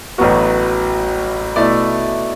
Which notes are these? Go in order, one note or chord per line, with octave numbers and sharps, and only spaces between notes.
A1 A2 F#3 B3 F#4
B2 A3 E4 D5